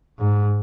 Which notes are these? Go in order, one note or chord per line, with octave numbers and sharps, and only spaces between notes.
G#2